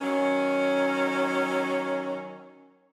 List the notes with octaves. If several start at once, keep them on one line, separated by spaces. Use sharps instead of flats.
D#3 F#3 C#4